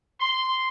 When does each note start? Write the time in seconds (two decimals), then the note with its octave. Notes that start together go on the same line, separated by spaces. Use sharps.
0.20 C6